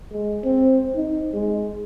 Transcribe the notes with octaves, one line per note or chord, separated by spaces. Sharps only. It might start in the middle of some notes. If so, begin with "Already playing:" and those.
G#3
C4
D#4
G#3